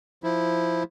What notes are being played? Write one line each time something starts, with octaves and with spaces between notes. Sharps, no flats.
F3 E4